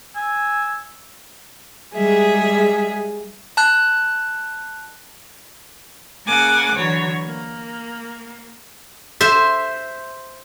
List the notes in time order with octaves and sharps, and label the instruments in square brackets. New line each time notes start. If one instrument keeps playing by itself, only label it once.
[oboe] G#5 [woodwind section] E6
[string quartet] G3 G#3 G#4 E5
[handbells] A5 F#6
[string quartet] C#3 A#3 F#5 G#5 D6
D3 E3 F#3 C#5
A#3
[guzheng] C5 E5